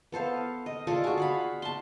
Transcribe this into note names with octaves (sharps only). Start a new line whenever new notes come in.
B3 A4 C5 F5
D#5
F4 G#4 A4 D5
F#4 G#4
F5 F#5 B5
A5 C6